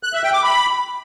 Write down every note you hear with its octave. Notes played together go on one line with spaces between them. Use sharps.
F#6
E5
G5
D6
B5